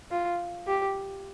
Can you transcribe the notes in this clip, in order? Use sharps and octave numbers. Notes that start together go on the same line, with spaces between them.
F4
G4